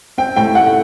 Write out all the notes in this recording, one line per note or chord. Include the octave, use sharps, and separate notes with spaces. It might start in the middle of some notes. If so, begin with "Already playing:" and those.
C4 G5
A2 G5
A3 F#5